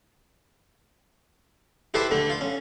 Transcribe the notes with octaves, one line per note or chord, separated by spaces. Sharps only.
E4 G4 A4 B4 C5 E5
D3 A3
F4
C#4